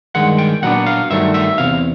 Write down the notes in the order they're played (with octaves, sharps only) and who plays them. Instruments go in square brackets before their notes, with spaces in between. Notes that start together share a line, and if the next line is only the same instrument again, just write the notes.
[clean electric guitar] G2 D#3 G#3 F#5
G5
A#2 F#3 B3 D4 F#5
F5
G2 D#3 F#3 A3 E5
E5
E2 C3 F5